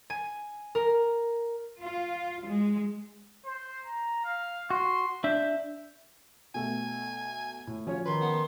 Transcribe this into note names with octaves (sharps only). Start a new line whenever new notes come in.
G#5
A#4
F4
G#3
C5
A#5
F5
F#4 C6
D4 E5 G6
B2 A3 G#5
A2
F3 C#4 F#4 C#5
D#3 B4 C6
B3